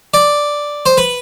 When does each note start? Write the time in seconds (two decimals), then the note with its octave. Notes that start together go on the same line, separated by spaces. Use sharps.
0.14 D5
0.86 C5
0.97 B4